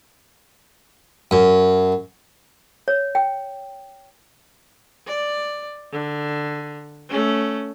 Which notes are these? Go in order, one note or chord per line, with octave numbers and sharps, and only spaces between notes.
F#2
C#5
G5
D5
D3
A3 C#4